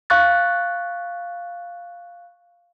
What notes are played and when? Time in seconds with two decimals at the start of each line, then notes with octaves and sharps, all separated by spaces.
0.10 F5 C#6 F#6 A6